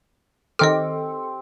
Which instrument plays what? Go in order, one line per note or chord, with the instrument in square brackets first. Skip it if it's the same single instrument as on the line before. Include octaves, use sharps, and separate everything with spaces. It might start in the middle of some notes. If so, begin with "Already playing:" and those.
[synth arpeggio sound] D#3 D6 [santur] C4 G4 [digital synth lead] A4 [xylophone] D#5 F6